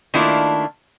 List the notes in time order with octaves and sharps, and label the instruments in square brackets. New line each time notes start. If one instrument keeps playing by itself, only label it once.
[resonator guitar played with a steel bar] D#3 A3 A#3 D4 E4 F4